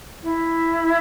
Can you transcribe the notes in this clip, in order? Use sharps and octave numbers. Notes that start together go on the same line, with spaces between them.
E4